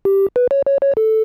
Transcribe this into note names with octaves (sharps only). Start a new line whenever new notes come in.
G4
B4
C#5
C#5
C#5
A4